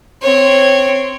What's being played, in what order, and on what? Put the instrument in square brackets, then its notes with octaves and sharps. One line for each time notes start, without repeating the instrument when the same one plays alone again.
[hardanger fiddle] C4 C#5